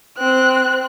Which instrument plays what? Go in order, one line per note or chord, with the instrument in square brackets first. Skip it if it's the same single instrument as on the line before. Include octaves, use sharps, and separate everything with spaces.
[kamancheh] C4 F#6